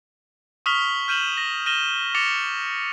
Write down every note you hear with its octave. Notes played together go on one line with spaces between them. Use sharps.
C#6 D#6 F6 B6 F7 G7
F6 G6 D#7 E7 F#7 G7
A#6
F6 A#6 D#7 E7 G7
D6 A6 A#6 C#7 E7 F7